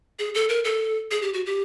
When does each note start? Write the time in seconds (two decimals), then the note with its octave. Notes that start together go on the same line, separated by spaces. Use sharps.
0.19 G#4
0.35 A4
0.49 A#4
0.65 A4
1.11 G#4
1.22 G4
1.34 F#4
1.46 G4